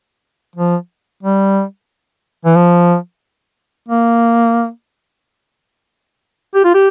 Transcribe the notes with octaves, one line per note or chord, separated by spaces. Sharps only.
F3
G3
E3
F3
A#3
G4
F4
G4